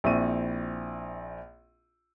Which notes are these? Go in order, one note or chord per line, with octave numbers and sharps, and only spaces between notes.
A#1 C4 E4 C#6 D#7